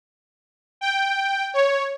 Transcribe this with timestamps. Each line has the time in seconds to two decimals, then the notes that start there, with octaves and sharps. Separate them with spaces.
0.81 G5
1.54 C#5